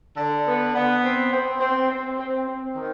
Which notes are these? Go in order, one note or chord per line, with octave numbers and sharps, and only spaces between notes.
D3
B3
B3
C4
C4
C4
C4
C4
C4
D#3